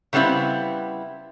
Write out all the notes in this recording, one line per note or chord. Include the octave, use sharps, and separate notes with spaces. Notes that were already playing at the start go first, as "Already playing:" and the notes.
C#3 G3 B3 C4 E4